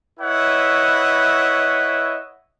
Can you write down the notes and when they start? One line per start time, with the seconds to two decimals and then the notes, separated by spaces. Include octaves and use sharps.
0.20 E4 B4 C#5 D#5 E5 F#5